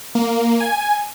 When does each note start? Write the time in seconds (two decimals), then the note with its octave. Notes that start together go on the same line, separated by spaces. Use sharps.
0.15 A#3
0.60 G#5